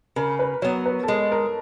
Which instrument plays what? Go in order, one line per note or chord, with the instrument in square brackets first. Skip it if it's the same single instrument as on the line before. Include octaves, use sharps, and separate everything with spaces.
[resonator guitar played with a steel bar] C#3 [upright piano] A#4
[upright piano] B4
[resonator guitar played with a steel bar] F#3 B3 [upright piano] C#5
[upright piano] B4
A4
[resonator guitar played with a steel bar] G#3 [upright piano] A#4
[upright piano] A#4